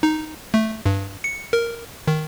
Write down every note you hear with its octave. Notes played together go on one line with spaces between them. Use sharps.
D#4
A3
G2
C#7
A#4
D#3